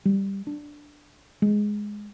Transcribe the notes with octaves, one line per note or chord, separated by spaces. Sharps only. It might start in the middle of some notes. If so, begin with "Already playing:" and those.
G3
D4
G#3